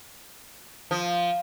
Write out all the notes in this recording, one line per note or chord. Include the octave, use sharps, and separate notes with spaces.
F3